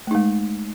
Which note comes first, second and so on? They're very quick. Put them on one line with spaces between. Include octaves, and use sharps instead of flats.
A3 D#4 G#3